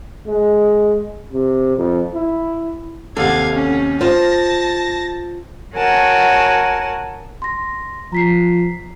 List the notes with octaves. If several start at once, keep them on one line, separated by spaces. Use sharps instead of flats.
G#3
C3
F2
E4
D#2 C3 A4 F5 F#5 G#6
C#4
F4 C5 A5 A#6
F#4 A#4 C#5 F#5 G#5 A5
C6 A#6
F3 A#5 B6 C7